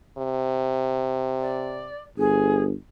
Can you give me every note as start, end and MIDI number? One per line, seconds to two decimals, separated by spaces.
0.18 1.94 48
1.41 2.00 74
2.18 2.73 31
2.18 2.63 68